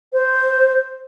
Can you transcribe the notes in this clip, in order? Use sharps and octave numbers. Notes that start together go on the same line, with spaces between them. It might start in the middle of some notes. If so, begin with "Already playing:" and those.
C5